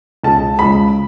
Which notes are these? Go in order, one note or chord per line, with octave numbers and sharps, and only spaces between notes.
C#2 C#3 G#3 A5
C#2 C#3 G#3 B5